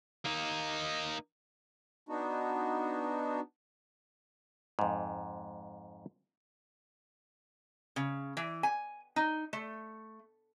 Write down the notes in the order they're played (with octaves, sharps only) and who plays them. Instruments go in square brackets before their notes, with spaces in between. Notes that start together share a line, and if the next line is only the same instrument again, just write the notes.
[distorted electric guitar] A#3 D#4
[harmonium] B3 D4 D#4 F#4
[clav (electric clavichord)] F2 G#2
[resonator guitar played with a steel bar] C#3
E3
G#5
D#4
A3